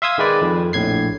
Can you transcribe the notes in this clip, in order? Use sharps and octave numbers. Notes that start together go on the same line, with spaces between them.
E5 F5 C6 D#6 E6 G#6
D#3 G#3 B4 D5
F2
A#1 A2 G#6 C7